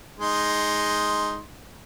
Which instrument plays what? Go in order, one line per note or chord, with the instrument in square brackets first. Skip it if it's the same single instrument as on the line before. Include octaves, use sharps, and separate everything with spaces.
[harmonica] G#3 D#4 C6